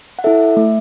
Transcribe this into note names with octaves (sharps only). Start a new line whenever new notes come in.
F#5
E4 A4 E5
A3